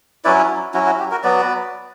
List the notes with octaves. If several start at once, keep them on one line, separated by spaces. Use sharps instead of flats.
F#3 C#4 E4 B4 D5
F#3 C#4 E4 F#4
F#4
G4
F#4 A#4
F#3 B3 F#4 B4 D5